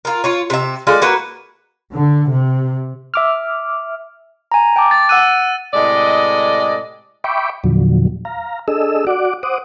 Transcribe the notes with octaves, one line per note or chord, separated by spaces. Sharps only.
F4 A#4
F4 C#5
C3 E5
G#3 F4 A4 D5
A#3 F#4 B4
D3
C3
E5 D6 F6
G#5 A#5
G5 A5 D6
A6
F#5 E6 F#6 D#7
A2 C3 G#3 D5 D#5
E5 G5 B5 C#6 D6
E2 A#2 D3 F3 F#3
F5 A#5
D4 G#4 A4 D#5 E6
F#4 D5 F#5 D6
C5 F#5 D6 D#6